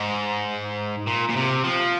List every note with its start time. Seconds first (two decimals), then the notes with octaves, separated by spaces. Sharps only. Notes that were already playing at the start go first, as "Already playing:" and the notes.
Already playing: G#2
1.07 A#2
1.29 A#2
1.36 C3
1.64 F3